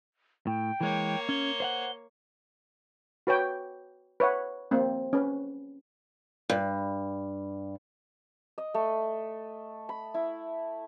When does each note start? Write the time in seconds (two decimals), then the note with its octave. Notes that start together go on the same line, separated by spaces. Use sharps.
0.47 A2 G5
0.81 E3 G#3 A#3 C#5
1.29 C#4 G7
1.60 C5 F5 F#5
3.27 F#4 B4 C#5 G5
4.20 B4 C#5 E5 F#5
4.71 A#3 C4
5.13 C#4 B4
6.50 G2
8.58 D#5
8.74 A3
9.89 B5
10.14 E4